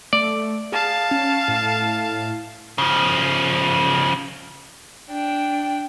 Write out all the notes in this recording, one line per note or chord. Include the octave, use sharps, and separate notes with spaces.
A3 D5
G#4 F5 A5
C#4
A2
C#3 F3
D4 G5